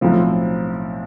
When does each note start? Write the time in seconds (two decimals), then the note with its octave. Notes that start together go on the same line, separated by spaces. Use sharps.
0.01 B1 A2 F3 C4